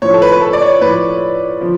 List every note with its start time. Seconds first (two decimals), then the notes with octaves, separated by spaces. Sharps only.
0.02 A2 F3 C#5
0.14 A4
0.22 B4
0.32 B4
0.41 A4
0.53 D5
0.62 C#5
0.81 A2 F3 B4
1.61 F3